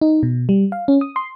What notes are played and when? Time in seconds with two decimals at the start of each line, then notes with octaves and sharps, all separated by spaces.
0.01 D#4
0.23 B2
0.49 G3
0.72 F5
0.88 C#4
1.01 D#6
1.16 C6